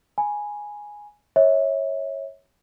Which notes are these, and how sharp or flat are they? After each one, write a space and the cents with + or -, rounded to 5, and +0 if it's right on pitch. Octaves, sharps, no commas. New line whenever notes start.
G#5 +0 B5 -25
C#5 -15 E5 -30